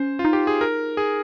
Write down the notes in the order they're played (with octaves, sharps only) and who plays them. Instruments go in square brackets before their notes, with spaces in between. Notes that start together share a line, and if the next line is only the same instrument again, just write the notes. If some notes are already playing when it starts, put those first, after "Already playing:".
Already playing: [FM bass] C#4 [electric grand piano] C5
[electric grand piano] F4
[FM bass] D#4
[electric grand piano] G4
G#4
A#4
G#4